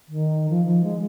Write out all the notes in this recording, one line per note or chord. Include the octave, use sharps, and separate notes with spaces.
D#3
F3
F3
G#3